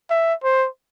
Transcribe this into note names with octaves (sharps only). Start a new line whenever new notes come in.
E5
C5